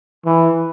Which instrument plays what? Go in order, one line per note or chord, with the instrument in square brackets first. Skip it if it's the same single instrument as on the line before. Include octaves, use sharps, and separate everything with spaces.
[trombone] E3